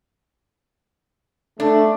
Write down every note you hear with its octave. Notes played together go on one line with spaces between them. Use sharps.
A3 D4